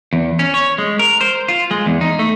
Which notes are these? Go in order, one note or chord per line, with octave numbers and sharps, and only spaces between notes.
E2
C#4
C#5
G#3
A#4
C5
F4
G#3
E2
D#4
A3